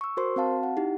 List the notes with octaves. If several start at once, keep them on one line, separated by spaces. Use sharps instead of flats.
C#6 E6
F#4 A#4 C5 C6
C4 F#4 F5 A5
F#5
D#4 E4 G4